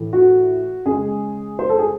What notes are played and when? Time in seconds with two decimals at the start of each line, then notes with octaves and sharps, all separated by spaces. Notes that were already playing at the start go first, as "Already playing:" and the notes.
Already playing: A2 E3
0.13 F#4
0.86 C#3 G#4
0.91 G#3
1.59 C5
1.70 A4
1.79 G#4